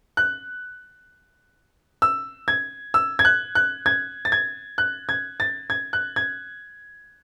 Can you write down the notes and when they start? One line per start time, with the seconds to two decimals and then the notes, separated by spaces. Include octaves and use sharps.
0.17 F#6
2.02 E6
2.48 G#6
2.94 E6
3.19 G#6
3.25 F#6
3.55 F#6
3.86 G#6
4.25 A6
4.32 G#6
4.78 F#6
5.09 G#6
5.40 A6
5.70 G#6
5.93 F#6
6.16 G#6